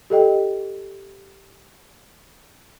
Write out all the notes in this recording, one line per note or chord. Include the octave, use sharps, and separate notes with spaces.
G4 A4 D#5 G5